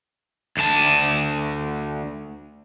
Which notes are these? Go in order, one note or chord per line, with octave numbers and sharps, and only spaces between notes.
D2 A5